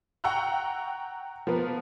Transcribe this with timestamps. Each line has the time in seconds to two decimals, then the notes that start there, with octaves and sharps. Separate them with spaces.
0.24 F#5 G5 A#5 C#6 E6 F#6
1.47 F3 A#3 B3